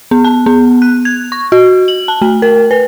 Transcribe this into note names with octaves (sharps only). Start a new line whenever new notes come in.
B3
A5
B3
F#6
G#6
C#6
F#4
F#7
A5
A3
A#4
B4